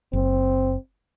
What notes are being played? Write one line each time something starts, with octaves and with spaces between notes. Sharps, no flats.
F#1 C4